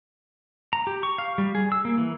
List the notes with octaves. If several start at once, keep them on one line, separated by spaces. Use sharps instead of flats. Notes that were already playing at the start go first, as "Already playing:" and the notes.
A#5
G4
C#6
F5
G3
G#4
E6
A#3
E3